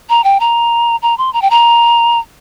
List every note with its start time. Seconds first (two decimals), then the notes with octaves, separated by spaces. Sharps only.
0.09 A#5
0.24 G5
0.40 A#5
1.02 A#5
1.18 C6
1.33 A#5
1.42 G5
1.50 A#5